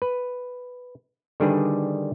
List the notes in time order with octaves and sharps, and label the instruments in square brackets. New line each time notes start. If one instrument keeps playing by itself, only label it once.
[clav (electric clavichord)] B4
D3 D#3 G3 D4 G#4 B4